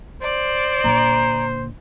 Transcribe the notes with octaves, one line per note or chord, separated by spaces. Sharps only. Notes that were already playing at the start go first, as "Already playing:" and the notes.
C5 D5
A#2 D3 A#5